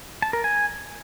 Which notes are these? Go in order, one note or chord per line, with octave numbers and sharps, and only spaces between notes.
A5
A#4
G#5